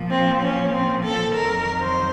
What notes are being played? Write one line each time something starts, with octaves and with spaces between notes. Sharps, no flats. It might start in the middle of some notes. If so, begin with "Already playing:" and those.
Already playing: A#2 F3
C4
C#4
C4
A4
F2 D#3 F#3 A#4
C5